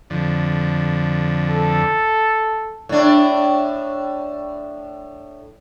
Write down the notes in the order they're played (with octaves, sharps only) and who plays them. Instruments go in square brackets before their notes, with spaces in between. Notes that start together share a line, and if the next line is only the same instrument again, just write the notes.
[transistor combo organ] F2 D3
[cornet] A4
[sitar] A2 D4